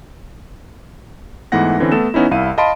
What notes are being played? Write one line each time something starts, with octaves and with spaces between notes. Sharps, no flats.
G#2 E3 A3 B3 F#5 A#6
D3 E3 C4 C#4
A3 B3 A4 E7
E3 B3 C#4 D#4 E4
C2 E4 F5 D#7
D#5 F5 A5 B5 C6 D7